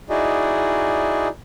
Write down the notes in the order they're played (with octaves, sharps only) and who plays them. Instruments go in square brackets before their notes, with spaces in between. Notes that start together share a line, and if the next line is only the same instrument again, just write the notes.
[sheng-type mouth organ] D#4 E4 F#4 G#4 D5 D#5